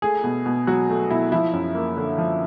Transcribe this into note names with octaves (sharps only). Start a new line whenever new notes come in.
A3 G#4
B2
B2
F#3 F#4
A3
B2 E4
F3 E4
F#2
A#3
D3
F3